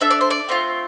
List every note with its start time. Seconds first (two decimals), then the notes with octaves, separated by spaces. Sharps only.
0.01 D4 A4 E5
0.11 D5
0.21 C5
0.31 D5
0.49 A3 C4 F4